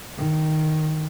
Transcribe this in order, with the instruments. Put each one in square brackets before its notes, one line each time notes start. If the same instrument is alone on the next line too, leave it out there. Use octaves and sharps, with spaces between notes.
[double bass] D#3